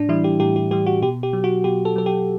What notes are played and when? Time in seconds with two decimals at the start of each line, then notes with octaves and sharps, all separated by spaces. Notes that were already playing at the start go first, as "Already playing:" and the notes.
Already playing: A2 D4
0.09 E3 G3 E4
0.24 G4
0.40 A2 G4
0.56 G4
0.71 E3 G3 G4
0.86 F#4
1.02 B2 G4
1.23 G4
1.33 F#3
1.44 F#4
1.64 B2 G4
1.85 A4
1.96 F#3 A4
2.06 G4